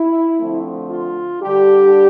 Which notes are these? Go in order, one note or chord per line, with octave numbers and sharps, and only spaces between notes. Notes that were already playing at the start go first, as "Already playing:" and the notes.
Already playing: E4
D3 F3 A3 C4
F4
D3 G3 D4 G4